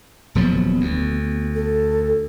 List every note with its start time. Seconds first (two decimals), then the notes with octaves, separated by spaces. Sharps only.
0.35 D#1 F3 F#3 B3
0.81 D2
1.55 A4